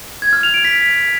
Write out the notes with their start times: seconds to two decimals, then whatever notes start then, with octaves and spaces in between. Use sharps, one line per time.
0.22 G#6
0.33 F6
0.43 F7
0.54 D7
0.65 B6